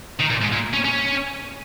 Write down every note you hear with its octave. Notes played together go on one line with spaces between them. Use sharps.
D#3
A#2
G#2
A#2
C#4
C#4